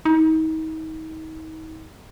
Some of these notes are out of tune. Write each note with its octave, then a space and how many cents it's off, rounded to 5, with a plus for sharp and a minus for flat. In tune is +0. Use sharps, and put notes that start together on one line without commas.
D#4 +35